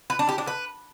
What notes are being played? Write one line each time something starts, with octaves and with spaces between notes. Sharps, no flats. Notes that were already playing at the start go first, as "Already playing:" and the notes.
B4
D4
G4
D4
B4